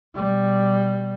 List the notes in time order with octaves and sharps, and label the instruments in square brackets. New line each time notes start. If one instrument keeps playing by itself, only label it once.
[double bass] B2 G3